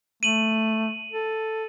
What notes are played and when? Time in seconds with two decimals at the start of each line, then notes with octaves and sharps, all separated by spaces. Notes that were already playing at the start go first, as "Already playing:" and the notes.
0.23 A3 D#7 F#7
1.11 A4